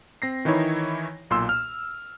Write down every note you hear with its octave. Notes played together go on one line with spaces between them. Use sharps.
C4 A#6 C7
D#3 E3 D#4 E4 C#5
B1 A#2 C6 E6
F6